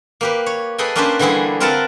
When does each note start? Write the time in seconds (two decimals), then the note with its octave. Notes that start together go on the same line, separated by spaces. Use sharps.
0.21 A#3 G4 B4
0.46 C#5
0.78 G#4 A4 B4 D#5 G5 G#5
0.95 A#3 C#4 D4 G4 B4 C5
1.19 D3 E3 G3 E4 G#4
1.60 C4 F4 A#4 B4 F#5 A5